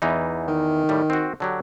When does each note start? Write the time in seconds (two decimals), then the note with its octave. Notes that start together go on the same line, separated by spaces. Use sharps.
0.02 E2 E3 D#4
0.48 D#3
0.89 A2 G3
1.10 C4 F#4
1.40 D3 F#3 G4